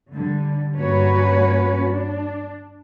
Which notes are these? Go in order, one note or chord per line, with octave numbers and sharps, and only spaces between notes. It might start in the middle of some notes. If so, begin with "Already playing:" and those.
D3 G3
G2 A#3 C#4 F#4 B4 C#5
D4